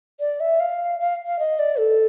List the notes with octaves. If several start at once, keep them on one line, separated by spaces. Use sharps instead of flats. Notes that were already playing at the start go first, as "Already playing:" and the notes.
D5
E5
F5
F5
F5
D#5
D5
A4